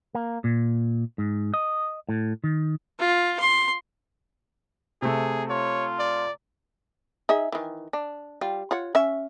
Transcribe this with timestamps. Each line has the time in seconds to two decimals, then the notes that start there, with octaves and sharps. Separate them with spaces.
0.15 A#3
0.44 A#2
1.18 G#2
1.54 D#5
2.09 A2
2.44 D#3
2.99 F4
3.40 C6
5.02 C3 A3 G#4
5.50 F4 C#5
5.99 D5
7.29 D#4 G#4 E5
7.52 D#3 E3
7.93 D4
8.41 G3 F4
8.71 F4 C#5 F#5
8.95 C#4 E5